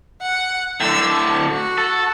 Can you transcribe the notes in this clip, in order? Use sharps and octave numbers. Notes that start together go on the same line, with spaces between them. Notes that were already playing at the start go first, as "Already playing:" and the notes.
F#5
A2 D3 E6
A5
F#4
A4